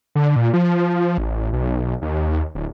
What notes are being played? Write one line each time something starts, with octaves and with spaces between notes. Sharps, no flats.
D3
A#2
F3
A1
B1
D#2
D1